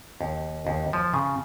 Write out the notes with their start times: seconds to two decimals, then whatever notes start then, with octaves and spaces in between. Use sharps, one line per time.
0.21 D#2
0.67 D#2
0.93 F3
1.14 C#3